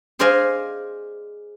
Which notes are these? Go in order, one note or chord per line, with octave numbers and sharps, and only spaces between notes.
G#4 C5 D5 D#5 F5 G#5